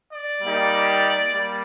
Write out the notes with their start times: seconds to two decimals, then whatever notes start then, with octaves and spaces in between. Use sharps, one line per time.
0.12 D5
0.42 G3 A#3 D#4 G4
1.31 G3 A#3